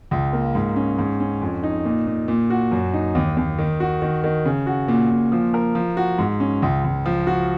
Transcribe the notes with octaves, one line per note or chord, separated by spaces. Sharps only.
C#2
A#3
G#2
C#4
G#2
C#4
F2
D#4
A#2
A#2
A#2
F#4
F#2
D#4
D#2
D#2
D#3
F#4
D#3
D#3
C#3
F#4
A#2
A#2
F3
A#4
F3
F#4
G#2
C#4
C#2
C#2
F3
F#4